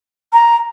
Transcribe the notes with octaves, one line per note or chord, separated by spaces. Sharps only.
A#5